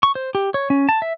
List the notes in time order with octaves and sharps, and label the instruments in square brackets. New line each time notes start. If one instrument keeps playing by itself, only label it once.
[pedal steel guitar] C#6
C5
G4
C#5
C#4
A5
E5